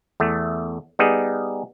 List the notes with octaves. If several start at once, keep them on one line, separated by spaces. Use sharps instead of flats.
E2 A3
G3 B3 D#4 G#4